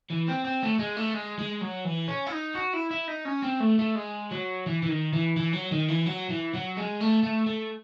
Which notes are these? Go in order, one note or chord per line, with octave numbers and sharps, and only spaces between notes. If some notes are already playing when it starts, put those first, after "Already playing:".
E3
C4
C4
A3
G#3
A3
G#3
G#3
F#3
E3
C#4
E4
D#4
F#4
E4
E4
D#4
C#4
C4
A3
A3
G#3
F#3
E3
E3
D#3
E3
E3
F#3
D#3
E3
F#3
E3
F#3
G#3
A3
A3
A3